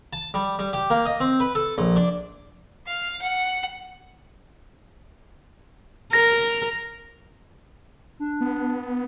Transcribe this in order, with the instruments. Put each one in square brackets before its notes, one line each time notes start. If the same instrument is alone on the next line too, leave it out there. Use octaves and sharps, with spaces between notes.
[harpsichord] A5
G3
G3
G4
A#3
D#5
C4
B4
A4
A#1
D4
[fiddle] F5
F#5
[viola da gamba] A#4 [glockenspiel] A#6
[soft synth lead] D4
[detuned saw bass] B3